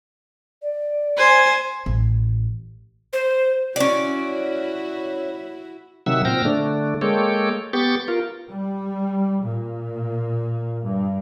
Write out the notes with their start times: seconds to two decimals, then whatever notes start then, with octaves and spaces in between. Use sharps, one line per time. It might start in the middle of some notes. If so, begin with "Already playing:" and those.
0.62 D5
1.17 C5 G#5
1.86 A1
3.13 C5
3.76 C#4 E4 F#4 D5
6.06 C3 D#3 F#3 E5 F#5 E6
6.25 A#2 C4 G5 F6 A#6
6.45 D3 A3 D4
7.01 G#3 A#3 A4 C#5 G5
7.73 B3 G4 C#6 G6 A6
8.08 F4 A#4
8.49 G3
9.44 A#2
10.85 G2